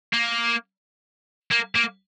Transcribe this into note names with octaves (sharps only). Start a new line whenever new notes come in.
A#3
A#3
A#3